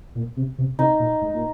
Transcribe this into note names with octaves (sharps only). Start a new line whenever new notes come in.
A#2
C3
C3
C3 D#4
A#2
G#2
A#2